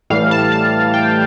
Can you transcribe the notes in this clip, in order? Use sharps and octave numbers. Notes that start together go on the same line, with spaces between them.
A2 E3 G3 F5
A5
A5
G5